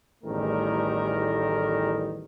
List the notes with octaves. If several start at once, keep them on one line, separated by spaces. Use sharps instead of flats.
A1 E2 D#3 G3 A3 A#4